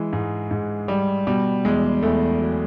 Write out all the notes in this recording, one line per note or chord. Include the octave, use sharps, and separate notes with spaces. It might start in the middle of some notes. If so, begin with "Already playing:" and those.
Already playing: E3 G#3
G#2
G#2
G3
B2 G3
E2 G#3
E2 A3
F#3